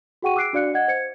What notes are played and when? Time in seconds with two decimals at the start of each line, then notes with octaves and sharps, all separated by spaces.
0.22 F#4 G#4 F#5 G5 C#6 D#7
0.36 D6 E6 F#6 C7 D7
0.53 D4 F#4 D5 F5 F#6 C#7
0.74 D#5 F#5 G#6
0.88 C5 G#6 C#7